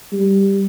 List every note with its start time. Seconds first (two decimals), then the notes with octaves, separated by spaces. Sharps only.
0.13 G3